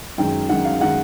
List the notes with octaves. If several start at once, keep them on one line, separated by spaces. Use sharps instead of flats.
F#2 D#3 G#3 G5
F#2 D#3 G#3 F#5
F5
D#3 G#3 F#5